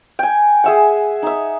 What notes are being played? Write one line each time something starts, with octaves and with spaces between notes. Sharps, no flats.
G5 G#5
G#4 E5 F#5
D#4 E5